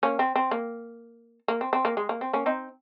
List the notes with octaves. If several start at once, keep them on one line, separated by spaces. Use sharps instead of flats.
A#3 C#4
C4
C4
A#3
A#3
C4
C4
A#3
G#3
A#3
C4
A#3 C#4
C4 D#4